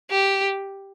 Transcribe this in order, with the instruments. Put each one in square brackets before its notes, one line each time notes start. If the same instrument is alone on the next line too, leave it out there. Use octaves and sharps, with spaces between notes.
[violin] G4